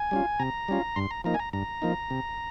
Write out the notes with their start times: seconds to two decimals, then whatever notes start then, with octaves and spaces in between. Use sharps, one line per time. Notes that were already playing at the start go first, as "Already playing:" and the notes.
Already playing: G#5
0.11 G3 C#4 F4
0.40 C3 A#5
0.68 G3 C#4 F4
0.96 G2 C6
1.11 A#5
1.24 F3 A#3 D#4 A#5
1.34 G#5
1.40 A#5
1.53 G2 A#5
1.82 F3 A#3 D#4
2.10 C3